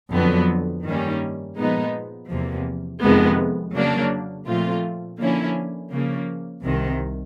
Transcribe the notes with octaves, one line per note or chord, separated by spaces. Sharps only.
F2 D3 F#3 B3
G2 D#3 G3 A#3 C#4
A#2 F3 G#3 B3 D#4
E2 C3 F3 A#3
F2 C3 D#3 G#3 B3
C#3 F#3 A#3 D4
A#2 F3 A3 C4 F4
D3 F3 A#3 C#4 E4
C#3 F3 A#3
C2 C3 D#3